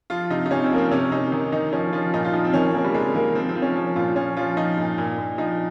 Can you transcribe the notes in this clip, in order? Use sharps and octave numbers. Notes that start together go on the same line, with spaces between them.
F3 F4
C3 D#4
D#4
C3 C#4
C4
F3 A#3
C4
C3 C#4
C3 D#4
D#3 D#4
D#3 D#4
F3 C#4
F3 F4
A#2 D#4
F4
F3 D#4
C4
D#3 C#4
C4
D#3 A#3
G3
C3 G#3
D#3 A#3
F3 C4
C4
F3
C#4
F3
A#2 F4
F3 C#4
F3 F4
F3 D#4
A#2
A#2
A#2
F3 D#4